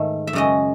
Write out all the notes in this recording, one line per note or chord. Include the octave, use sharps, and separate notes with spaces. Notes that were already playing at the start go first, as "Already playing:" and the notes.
Already playing: G#2 D#3 A3 E5
E5
F#2 C#3 G#3 D#5